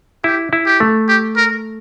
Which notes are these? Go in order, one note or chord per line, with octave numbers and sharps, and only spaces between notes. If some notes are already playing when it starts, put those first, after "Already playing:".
E4 G4
E4
G4
A3
G4
A#4